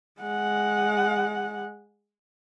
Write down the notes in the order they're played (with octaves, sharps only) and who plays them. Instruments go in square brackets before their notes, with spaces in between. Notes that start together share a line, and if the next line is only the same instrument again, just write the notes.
[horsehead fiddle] G#3 F#5